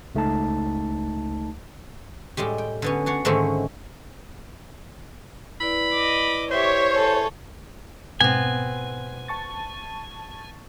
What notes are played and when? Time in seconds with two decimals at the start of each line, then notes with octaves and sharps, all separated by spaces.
0.15 C#2 A3 D#4 A5
2.37 A2 G3 G#3 G4
2.58 G5
2.82 D3 B3 C#4
3.06 D4 F#4 C#5
3.25 G#2 D3 D#3 A3 C4 C#4
5.60 E4 B4 D5 B5
5.93 D#5 D6
6.51 G4 C5 C#5 E5
6.92 G#4 A4
8.21 G#2 B2 B3 C4 G#5
9.28 A5 C#6 A6